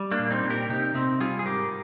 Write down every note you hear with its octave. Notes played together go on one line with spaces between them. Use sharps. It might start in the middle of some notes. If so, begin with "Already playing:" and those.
Already playing: G3
A#3 D4
A#2
C4 D#4
A#2
G4 A#4
C3 D#4 G4
C3 C4 D#4
G3 F4 G#4
G#4
G#2 G4 A#4